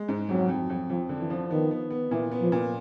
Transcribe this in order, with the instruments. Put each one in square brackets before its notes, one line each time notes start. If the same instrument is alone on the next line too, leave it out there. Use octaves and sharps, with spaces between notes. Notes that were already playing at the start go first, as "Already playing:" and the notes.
Already playing: [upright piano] G#3
G#2
[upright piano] F2 [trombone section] F#3
[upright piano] F2
F2
[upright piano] F2 [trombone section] F3
[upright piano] D3
[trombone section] E3
[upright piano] F3
[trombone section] D#3 [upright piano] B3
[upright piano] B3
B3
[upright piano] A#2 [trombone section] E3
[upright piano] B3
[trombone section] F3
[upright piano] A#2